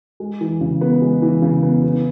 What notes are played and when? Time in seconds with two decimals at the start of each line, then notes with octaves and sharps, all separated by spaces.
0.20 G#3
0.41 E3
0.61 C#3
0.81 B3
1.02 G#3
1.22 E3
1.42 C#3
1.63 B3
1.83 B3